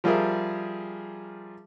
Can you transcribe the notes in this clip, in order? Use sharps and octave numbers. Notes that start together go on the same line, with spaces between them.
F3 G3 F4 G#4 A#4 E5